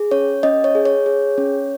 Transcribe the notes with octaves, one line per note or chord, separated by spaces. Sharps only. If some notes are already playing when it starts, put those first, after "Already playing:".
Already playing: G#4
C#4 C#5
C#4 D#5
C#5
G#4
C#5
G#4
C#4